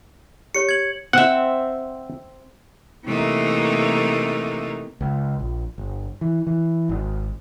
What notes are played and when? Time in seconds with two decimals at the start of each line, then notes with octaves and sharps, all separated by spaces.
0.55 G4 C#5 C#7
0.69 G#6 F#7
1.13 C4 E5 F#5
3.05 C3 E3 A3 A#3 D#4 A#4
5.01 C#2
5.39 A#1
5.78 G1
6.21 E3
6.47 E3
6.89 G#1